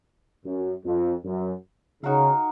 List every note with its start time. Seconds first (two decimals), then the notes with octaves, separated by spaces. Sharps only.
0.45 F#2
0.85 F2
1.25 F#2
2.03 C#3 D#4 F#4 A#4 F5